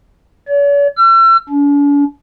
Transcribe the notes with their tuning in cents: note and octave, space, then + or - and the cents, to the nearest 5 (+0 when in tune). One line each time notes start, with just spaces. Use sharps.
C#5 +45
E6 +40
D4 -45